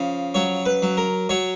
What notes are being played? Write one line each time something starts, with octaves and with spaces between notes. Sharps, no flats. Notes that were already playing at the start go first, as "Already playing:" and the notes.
Already playing: C#3 F3
F#3 C#5
B4
F#3
A#4
F#3 C#5